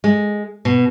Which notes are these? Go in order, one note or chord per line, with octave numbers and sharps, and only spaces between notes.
G#3
B2